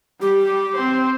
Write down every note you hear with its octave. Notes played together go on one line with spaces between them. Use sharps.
G3 G4
C4 C5